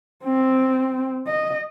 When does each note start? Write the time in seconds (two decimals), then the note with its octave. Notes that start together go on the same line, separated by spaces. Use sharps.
0.24 C4
1.27 D#5